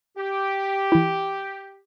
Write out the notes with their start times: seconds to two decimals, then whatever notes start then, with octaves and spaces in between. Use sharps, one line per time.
0.17 G4
0.92 E3 E4